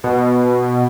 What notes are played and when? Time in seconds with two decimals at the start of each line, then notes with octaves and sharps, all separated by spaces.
0.04 B2